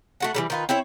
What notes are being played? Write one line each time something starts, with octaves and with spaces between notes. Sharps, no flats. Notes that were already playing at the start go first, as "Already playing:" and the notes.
A3 F#4 F#5
E3 F#3 G3
D#3 F4 B4
C4 E4 C#5 E5